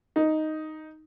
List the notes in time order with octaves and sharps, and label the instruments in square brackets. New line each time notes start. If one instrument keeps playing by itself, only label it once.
[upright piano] D#4